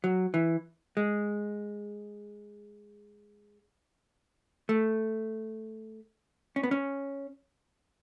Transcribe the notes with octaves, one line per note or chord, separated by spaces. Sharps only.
F#3
E3
G#3
A3
C#4
B3
C#4